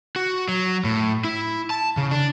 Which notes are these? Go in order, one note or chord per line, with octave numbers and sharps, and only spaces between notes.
F#4
F#3
A2
E4
A5
C#3
D4